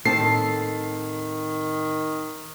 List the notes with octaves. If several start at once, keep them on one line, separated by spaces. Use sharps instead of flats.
A2 D#3 C4 A4 C7